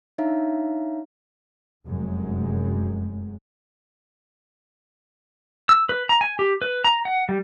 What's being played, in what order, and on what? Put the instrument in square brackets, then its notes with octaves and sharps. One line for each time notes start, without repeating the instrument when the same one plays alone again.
[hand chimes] D4 D#4 C#5 E5 F5 A#5
[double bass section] F1 F#2 G#3
[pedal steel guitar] E6
B4
A#5
G#5
G4
B4
A#5
F#5
G3